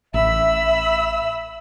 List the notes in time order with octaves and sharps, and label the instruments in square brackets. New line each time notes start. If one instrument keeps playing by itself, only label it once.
[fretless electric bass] A1 [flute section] E5 [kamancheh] B5 E6